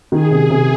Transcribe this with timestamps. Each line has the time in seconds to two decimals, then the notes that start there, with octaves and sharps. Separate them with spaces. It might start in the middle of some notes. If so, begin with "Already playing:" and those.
0.12 D#3 G#4
0.31 C3
0.40 G#4
0.50 C3